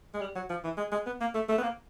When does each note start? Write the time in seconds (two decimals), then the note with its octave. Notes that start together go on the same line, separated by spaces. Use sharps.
0.14 G#3
0.21 G3
0.36 F#3
0.49 F3
0.64 E3
0.78 G#3
0.92 G#3
1.06 B3
1.21 A#3
1.35 A3
1.49 A3
1.58 B3
1.63 A#3